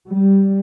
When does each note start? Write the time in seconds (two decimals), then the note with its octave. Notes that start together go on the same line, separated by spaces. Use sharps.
0.10 G3